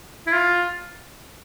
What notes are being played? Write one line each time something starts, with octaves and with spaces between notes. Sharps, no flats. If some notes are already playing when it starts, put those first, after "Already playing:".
E4
F4